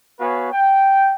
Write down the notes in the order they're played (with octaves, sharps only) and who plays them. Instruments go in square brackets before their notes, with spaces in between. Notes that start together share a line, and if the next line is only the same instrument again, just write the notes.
[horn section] B3 F#4 B4 C#5 F5 G#5
G5